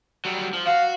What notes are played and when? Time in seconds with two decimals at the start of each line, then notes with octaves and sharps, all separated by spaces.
0.25 F#3 G3
0.53 F3
0.67 F#4 F5